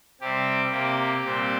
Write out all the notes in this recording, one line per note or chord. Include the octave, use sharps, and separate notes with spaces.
C3 G3 C4 G4
C3 A#3
A#2 G3 C4